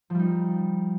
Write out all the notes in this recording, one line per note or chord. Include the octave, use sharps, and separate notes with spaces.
F3 G3 D#4